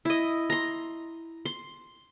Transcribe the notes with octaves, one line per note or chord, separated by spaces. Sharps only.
E4 D#5
A#5 C6
C6